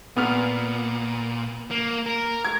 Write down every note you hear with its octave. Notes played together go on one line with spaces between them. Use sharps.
A#2 B3 F6
A#3
A#4
G#6